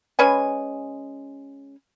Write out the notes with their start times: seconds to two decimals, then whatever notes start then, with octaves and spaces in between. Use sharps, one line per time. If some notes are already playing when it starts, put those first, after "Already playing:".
0.19 G#3 C#4 B4 G#5